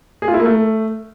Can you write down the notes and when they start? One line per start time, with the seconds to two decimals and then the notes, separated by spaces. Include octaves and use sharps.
0.22 G#4
0.28 F4
0.34 E4
0.40 A#3
0.46 A3